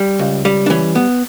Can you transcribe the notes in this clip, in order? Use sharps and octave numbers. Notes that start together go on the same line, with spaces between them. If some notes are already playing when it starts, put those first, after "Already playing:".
Already playing: G3
C#2
G3
D4
E3 C#4
B3